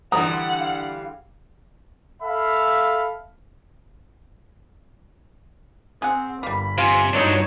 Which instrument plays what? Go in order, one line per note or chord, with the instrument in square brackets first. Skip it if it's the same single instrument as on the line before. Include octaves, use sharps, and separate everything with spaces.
[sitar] D3 E3 G3 [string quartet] F#5 [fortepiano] A#5 D#6
[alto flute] F5
[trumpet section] A4 E5 F5 B5
[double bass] C4 [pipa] G#4 F#5
[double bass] G1 [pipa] G3 A#3 [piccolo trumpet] B5
[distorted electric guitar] C3 [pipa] F4 [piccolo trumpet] G#5
[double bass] G2 D#4 [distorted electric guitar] F#3 D4 [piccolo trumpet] C#5